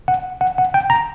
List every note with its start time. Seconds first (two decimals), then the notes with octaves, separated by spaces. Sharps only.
0.08 F#5
0.41 F#5
0.58 F#5
0.74 G5
0.90 A#5